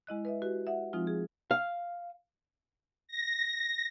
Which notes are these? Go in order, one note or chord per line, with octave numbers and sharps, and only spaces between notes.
G#3 E4 D#5 F#6
B4 D#5 E5
F#4 G4 B4
E5 F#5
F3 G#3 C4 D#4 F4
G#4
F5
A#6